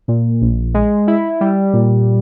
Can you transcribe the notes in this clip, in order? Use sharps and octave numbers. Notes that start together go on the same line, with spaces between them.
A#2
A#1
G#3
E4
G3
A#2